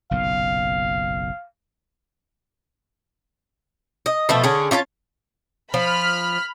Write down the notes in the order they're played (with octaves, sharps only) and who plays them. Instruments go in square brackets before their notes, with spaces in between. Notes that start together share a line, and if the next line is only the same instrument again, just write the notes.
[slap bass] F#1 B1 A#2 [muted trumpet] F5
[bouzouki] D#5
B2 F3 A3
D3 C#4 G#4
C#4 F4 C#5 A5
[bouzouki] F3 [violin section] B5 F6